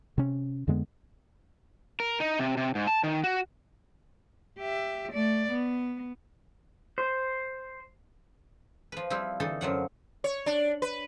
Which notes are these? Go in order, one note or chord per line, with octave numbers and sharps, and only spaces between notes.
C3 C#4
F2 D3 G#3 B3
A#4
D#4
C3
C3
G#2
A5
D#3
F#4
G4 E5
A3 D5
B3
C5
F3 B4
F3 G3 C4 E4
D3 E3 D#4 A4
F#2 F3 F#3 F#5
C#5
D4
B4